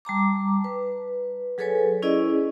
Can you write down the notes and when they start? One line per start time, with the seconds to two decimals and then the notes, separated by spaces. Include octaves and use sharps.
0.05 G3 A5 A#5 D6
0.64 B4
1.58 F#3 G#4 A4 B4 C#5 G#5
2.02 C#4 E4 G#4 D5 D#5